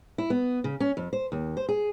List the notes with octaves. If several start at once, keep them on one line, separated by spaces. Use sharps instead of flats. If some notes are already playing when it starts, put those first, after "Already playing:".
E4
B3
C#3
C#4
F2
C5
D#2
C5
G#4